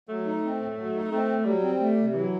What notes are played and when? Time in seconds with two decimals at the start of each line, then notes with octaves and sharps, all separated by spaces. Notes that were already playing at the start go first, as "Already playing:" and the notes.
0.09 F#3 A3
0.26 D#4
0.44 C4
0.61 A2
0.78 F#3
0.94 D#4
1.11 A3 C4
1.29 A2
1.45 F#3 G3
1.63 C4
1.80 A3
1.97 C3
2.14 E3 F#3